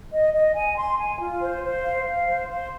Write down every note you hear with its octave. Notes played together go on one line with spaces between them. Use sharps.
D#5
D#5
G#5
C6
G#5
F4
C5
C5
F5
F5
C5
C5